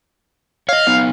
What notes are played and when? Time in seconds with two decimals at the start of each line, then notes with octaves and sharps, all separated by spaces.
0.69 C#5 D#5 F5
0.87 B3 D#4